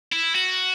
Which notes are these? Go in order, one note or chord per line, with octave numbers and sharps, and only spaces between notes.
E4
F#4